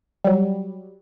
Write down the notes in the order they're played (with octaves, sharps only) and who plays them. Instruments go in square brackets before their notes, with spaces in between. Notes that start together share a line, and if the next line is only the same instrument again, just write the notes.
[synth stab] F#3 G3